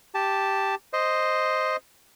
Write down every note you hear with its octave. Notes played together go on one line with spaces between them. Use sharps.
G4 A5
C5 D#5